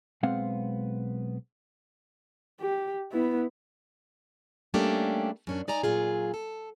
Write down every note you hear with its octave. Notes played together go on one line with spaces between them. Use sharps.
B1 G#3 B3 C4 F5 F#5
G4
B3 E4
G3 A3 A#3 C#4 D4 G4
F#2 C#4 D4
D#4 D5 G#5 A#5
A#2 C#3 F#3 F4 G#4
A4